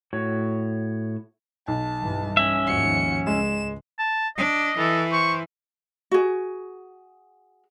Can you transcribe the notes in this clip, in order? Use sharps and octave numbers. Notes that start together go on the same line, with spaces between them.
A2 F#4 C#5
B1 A5
G2 E3 G3
C#4 E5
D#2 G#2 F3 F#4 C#7
C#2 G#3 E7
A5
D4 D#5
E3 A4
C5 C#6
F#4 G#4